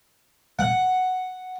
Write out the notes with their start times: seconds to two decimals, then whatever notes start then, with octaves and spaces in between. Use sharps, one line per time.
0.59 F#5